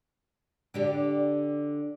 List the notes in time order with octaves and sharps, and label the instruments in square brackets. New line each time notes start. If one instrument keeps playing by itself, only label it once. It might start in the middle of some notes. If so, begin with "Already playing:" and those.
[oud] D3 D4 G4